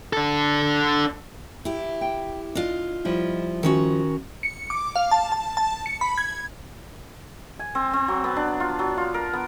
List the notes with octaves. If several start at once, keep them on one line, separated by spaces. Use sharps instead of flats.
D4 A4
E4 G4
G5
D4 F4 D#5
F3 G3 E4
D#3 C#4 F#4
C#7
D6
F5
A5
A5
A5
C#7
B5
G#6
G#5
C4
C4
F#3
B3
D4
F4
F#3
F4
A#4
B3